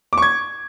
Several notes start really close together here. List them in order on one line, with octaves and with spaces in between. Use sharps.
D6 C#6 G#6